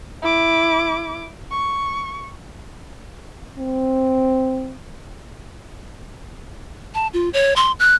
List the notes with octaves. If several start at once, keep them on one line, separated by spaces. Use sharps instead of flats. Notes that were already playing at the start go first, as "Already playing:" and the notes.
E4 D6
C#6
C4
A5
F4
C#5
C6
F#6